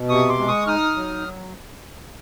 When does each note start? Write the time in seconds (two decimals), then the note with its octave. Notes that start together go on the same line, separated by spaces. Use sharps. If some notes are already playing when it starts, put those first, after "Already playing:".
Already playing: B2
0.09 C3 C#6 D#6
0.29 C6 D6
0.38 G#3
0.48 C#6 D#6
0.67 D#4 D#6 F6
0.96 F#3